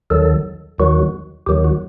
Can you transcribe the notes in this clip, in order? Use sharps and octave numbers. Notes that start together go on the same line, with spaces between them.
D#2 D#3 F#3 A4
D#2 D#3 F#3 F#4
D#2 D#3 F#3 G4
F#4